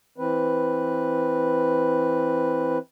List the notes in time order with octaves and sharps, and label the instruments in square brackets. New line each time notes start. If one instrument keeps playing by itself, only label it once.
[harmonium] E3 C4 B4